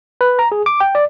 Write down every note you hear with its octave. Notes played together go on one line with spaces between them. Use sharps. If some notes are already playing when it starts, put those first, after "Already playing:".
B4
A#5
G#4
D6
G5
D5